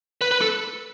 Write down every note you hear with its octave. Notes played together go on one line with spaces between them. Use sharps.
B4
B4
A4